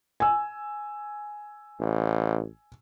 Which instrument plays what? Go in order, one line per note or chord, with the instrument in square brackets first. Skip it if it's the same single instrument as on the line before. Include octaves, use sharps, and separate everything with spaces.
[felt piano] G#5 E6
[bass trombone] A1